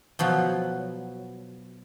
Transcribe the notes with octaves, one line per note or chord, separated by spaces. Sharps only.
B2 F3 F#3